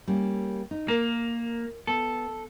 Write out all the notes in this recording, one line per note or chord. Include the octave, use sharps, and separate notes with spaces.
G3 A#3 C#4
D#4
A#3 A#4
B3 A4